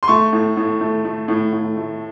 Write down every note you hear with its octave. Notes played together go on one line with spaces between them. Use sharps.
C6
A3 C#6
A2
A2
A3
A3
A2
A2
A3